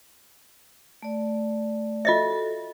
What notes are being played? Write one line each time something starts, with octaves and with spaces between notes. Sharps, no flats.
A3 D5
F4 F#4 A4 D#5 E5